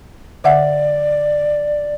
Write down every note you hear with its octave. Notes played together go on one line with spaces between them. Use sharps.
D3 D5 E5 F#5